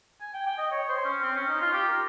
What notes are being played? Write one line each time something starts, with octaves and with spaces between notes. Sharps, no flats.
G#5
G5
G5
D#5
C#5
C5
C#4
C4
C#4
D#4
F4
G4
A#4